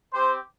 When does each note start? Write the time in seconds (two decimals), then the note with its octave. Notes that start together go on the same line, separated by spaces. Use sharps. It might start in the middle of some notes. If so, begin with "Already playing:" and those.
0.13 C4 G4 C5